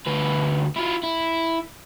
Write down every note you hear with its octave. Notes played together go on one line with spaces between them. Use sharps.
D2 B4
E4 F4
E4